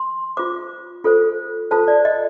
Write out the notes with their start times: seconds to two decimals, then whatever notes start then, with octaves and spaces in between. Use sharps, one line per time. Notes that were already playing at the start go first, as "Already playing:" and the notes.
Already playing: C6
0.37 F4 C5 D6
1.04 F4 A4 C5
1.71 F4 A4 C5 A5
1.88 D5
2.05 D#5